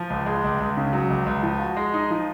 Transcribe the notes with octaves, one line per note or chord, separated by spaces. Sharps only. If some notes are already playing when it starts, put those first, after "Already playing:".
Already playing: F3
C#2
G#3
C#2
C#2
C#3
F#3
C#2
C#2
F3
F#4
G#3
D#4
F3